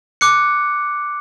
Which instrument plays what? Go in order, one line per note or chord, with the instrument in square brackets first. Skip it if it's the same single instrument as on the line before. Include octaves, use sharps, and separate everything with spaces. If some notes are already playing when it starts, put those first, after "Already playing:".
[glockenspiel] D6 F#6 C#7